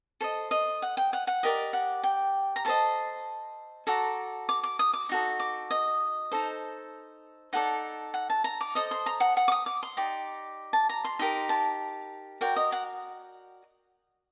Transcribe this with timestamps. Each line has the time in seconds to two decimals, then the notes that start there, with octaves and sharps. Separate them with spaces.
0.21 A4 C5 D#5
0.51 D#5
0.82 F#5
0.97 G5
1.13 F#5
1.27 F#5
1.43 G4 A#4 D5 D#5
1.73 F#5
2.04 G5
2.56 A#5
2.65 A4 C5 D#5 A5
3.87 F#4 A4 D5 A#5
4.49 D6
4.63 D6
4.79 D#6
4.93 D6
5.09 D#4 F#4 A4
5.40 D6
5.71 D#5
6.32 D#4 A4 C5
7.53 D#4 A4 D5 F#5
8.14 F#5
8.30 A5
8.44 A#5
8.61 D6
8.75 A4 C5 D#5 D#6
8.91 C6
9.06 A#5
9.20 F#5
9.37 F#5
9.48 D6
9.52 D#6
9.66 D6
9.83 C6
9.97 D#4 G4 D5
10.73 A5
10.89 A#5
11.05 C6
11.19 D#4 G4 A#4 C6
11.49 A5
12.41 F#4 A#4 D5 G5
12.56 D#5
12.72 F#5